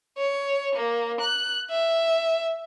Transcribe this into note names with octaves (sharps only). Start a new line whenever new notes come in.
C#5
A#3
F#6
E5